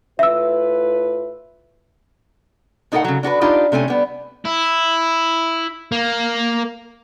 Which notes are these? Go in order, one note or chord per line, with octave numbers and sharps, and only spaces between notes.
A2 F4 B4 E5 E6
A2 D#4 A4 A#4 F5 F#5
C#3 F#3
D4 F#4 A4 B4
D4 D#4 F4 G4 B4
C3 A3 C#4 G#5
G3 B3
E4
A#3